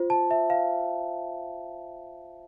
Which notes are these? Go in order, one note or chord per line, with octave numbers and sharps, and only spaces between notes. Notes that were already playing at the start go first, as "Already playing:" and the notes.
Already playing: F4 C5
A5
E5
F5